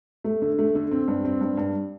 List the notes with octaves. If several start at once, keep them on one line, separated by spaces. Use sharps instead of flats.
A3
D3
A3
D3
C4
G2
C4
G2
G2